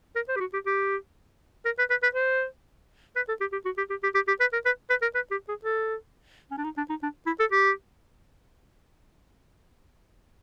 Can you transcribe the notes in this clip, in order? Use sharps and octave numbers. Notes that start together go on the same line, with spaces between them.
A#4
C5
G4
F#4
G4
G4
A#4
B4
B4
B4
C5
B4
A4
G4
G4
F#4
G4
G4
G4
G4
G4
B4
A#4
B4
B4
A#4
B4
G4
G#4
A4
C#4
D4
D#4
D4
D#4
D4
E4
A4
G4